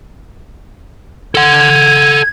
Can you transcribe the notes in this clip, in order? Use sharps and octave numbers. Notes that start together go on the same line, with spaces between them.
A4 F#5 G#6